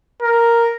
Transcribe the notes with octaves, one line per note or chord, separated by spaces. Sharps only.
A#4